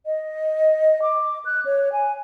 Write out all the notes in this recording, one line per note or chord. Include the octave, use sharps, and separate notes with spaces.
D#5
D6
F#6
C#5
G#5